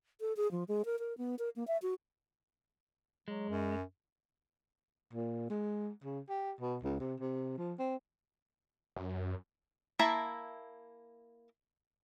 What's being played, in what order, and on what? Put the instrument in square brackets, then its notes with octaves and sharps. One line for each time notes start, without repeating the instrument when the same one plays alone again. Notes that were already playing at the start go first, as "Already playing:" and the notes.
[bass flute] A4
G#4
F3
G#3
A#4
A#4
B3
A#4
A#3
E5
F#4
[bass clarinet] F#3 [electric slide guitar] G#3
[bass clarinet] F#2
[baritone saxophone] A#2
G#3
C#3
G4
B2
C#2
C3
C3
F3
C4
[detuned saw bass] F#2
[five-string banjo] A#3 E4 E5 A5 A#5